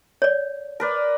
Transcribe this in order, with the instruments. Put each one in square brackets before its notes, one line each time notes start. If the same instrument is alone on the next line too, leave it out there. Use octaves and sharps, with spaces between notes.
[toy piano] C#5 D5
[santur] A#4 B4 D5